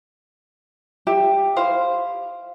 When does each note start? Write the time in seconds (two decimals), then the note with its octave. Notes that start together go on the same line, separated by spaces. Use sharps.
1.07 G4 E5
1.56 E4 C5 F5